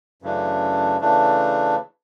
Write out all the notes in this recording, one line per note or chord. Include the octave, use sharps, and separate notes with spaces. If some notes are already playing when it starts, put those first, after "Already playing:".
F#2 C#3 E3 A3 D4
C#3 E3 A3 D4